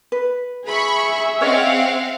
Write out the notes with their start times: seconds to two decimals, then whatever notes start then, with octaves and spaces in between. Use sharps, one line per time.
0.12 B4
0.66 G#4 E5 B5 C#6
1.41 C4 C#4 C#5 D#5 F5 F#5